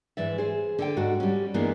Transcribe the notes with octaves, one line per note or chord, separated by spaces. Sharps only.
G#2 E3 D5 E5
G#4 C5
D3 A4 G5
G#2 F#4 F#5
G3 C#4
G2 E3 G#3 A#3 B3 D4